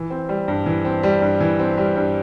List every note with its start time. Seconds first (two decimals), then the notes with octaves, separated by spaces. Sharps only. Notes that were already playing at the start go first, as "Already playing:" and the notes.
Already playing: E3
0.10 C4
0.29 G3
0.48 G2
0.66 E3
0.85 C4
1.03 G3
1.22 G2
1.41 E3
1.59 C4
1.77 G3
1.96 G2